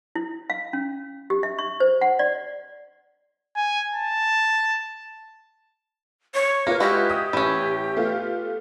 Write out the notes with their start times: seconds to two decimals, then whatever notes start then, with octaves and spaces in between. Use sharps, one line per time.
0.15 E4
0.50 F5
0.73 C#4
1.30 G4
1.43 E5
1.59 C#6
1.80 C5
2.01 F#5
2.19 D5
3.56 G#5
3.94 A5
6.34 C#5
6.67 A#3 F4 B4
6.80 G#3 E4 F#4 G4
7.10 D#6
7.33 A1 E3 C#4
7.96 A3 B3 F4